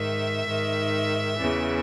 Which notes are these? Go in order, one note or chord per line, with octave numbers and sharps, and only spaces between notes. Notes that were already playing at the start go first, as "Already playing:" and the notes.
Already playing: G#2 D#3 E5
G#2 D#3
E2 C#3 E3